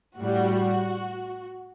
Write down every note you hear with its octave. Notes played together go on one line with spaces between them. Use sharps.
A2 G3 F#4